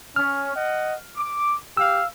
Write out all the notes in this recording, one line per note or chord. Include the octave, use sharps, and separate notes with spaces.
C#4 F6
D#5 F#5
D6
G4 F5 E6